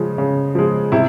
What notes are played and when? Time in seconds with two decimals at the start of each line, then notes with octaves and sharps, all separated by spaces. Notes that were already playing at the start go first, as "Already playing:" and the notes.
Already playing: C#3 F3 G#3
0.18 C#3
0.55 F3 G#3
0.92 C3 E4